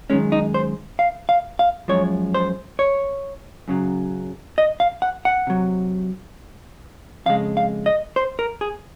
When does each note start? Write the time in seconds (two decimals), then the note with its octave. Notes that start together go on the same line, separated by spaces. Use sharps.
0.10 F#2 D#3 G#3 C#4
0.32 D#4
0.54 C5
0.99 F5
1.29 F5
1.59 F5
1.88 F#2 F3 G#3 C#5
2.34 C5
2.79 C#5
3.68 F#2 C#3 F#3
4.58 D#5
4.80 F5
5.02 F#5
5.25 F#5
5.47 C3 F#3
7.26 F2 C#3 G#3 F5
7.57 F5
7.86 D#5
8.16 C5
8.39 A#4
8.61 G#4